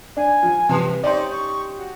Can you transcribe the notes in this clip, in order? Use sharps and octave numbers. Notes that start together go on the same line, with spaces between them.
D4 G#5
F3
C3 E3 G3 B4
C#4 D#4 G4 C5 D5 C6
C#6
F#4